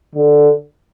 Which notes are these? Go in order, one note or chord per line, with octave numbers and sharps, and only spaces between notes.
D3